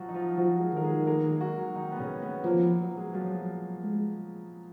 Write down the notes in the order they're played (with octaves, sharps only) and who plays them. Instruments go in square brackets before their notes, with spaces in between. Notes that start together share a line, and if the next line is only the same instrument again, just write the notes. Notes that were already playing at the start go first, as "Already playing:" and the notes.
Already playing: [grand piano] F3 F#3 F4 F#4
D#4
F3 F4
[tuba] F3 [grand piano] F#3 F#4
[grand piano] G#3 G#4
[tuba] D#3 [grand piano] A#4
[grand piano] G#3 G#4
A#3 A#4
G#3 G#4
F#3 F#4
D#3 D#4
B3
C#3 C#4
B3
[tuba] F3 [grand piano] A#3
[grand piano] B3
F#3 F#4
G#3 G#4
[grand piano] F3 F4 [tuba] F#3
[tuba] G#3